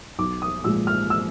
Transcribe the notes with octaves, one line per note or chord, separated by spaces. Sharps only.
B1 D6
D#6
A#2 F3 G#3 E6
F6
E6